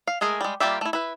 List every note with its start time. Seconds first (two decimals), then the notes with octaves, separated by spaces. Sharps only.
0.07 F5
0.21 G#3 A3 G#4 A#4
0.41 G3 G#3
0.60 G3 A#3 F4 G4 E5
0.81 A3 E4
0.93 E4 B4